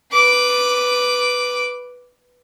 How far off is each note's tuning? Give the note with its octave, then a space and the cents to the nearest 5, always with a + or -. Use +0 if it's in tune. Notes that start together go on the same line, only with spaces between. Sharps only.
B4 +0 D6 +0